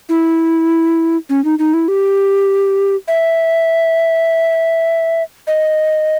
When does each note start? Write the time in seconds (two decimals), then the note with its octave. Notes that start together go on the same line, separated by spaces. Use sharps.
0.09 E4
1.29 C#4
1.45 D#4
1.59 D#4
1.74 E4
1.88 G4
3.08 E5
5.47 D#5